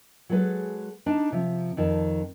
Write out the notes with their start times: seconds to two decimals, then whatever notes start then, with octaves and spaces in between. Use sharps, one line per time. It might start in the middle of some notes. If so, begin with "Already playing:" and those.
0.29 F#3 G#3 G#4 A4 B4
1.06 D4 D#4 A5
1.32 C3 F3
1.77 F2 D#3 A5